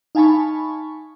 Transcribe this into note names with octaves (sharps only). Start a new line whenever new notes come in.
D#4 F5 G#5 A5 B5 C#6